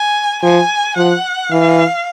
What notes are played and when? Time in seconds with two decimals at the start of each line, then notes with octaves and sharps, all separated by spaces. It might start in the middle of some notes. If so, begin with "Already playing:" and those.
Already playing: G#5
0.43 F3 G#5
0.97 F3 F#5
1.51 E3 F5